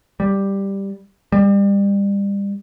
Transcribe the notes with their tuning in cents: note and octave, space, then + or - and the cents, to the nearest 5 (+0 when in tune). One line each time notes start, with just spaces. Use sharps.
G3 +5
G3 +30